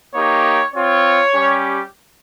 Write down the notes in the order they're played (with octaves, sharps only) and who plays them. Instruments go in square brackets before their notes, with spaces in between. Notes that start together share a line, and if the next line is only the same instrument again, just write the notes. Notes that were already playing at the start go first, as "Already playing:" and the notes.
[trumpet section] A#3 D#4 G4 C#5
C4 F4 C#5
G3 C#4 G4